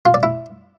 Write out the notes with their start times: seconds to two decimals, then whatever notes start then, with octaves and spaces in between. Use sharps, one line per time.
0.06 F4
0.14 D5
0.23 E4